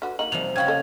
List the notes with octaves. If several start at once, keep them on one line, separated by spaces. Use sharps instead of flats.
D3 F#4 B4
A#3 D#4 F#7
C3 F3 G3 F7
C#3 F#4 F5 G5 B5 G#6
A#3 A4 D#5